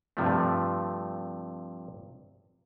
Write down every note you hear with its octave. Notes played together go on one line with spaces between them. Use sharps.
G2 C3 F3 A3